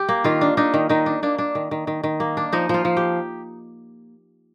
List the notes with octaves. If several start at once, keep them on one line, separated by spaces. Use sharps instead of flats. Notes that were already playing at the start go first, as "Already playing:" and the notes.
Already playing: G4
A#3
D#3 F4
D4
D4 D#4
D#3
D#3 D#4
D4
A#3 D4
D4
D#3
D#3
D#3
D#3
A#3
D4
F3 D#4
F3 F4
F3
G4